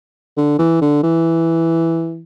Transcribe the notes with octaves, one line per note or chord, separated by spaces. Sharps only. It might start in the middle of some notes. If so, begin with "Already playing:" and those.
D3
E3
D3
E3